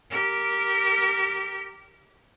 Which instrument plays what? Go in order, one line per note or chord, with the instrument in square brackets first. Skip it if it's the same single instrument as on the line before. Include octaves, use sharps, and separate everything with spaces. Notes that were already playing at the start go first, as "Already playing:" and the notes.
[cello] G4 A#4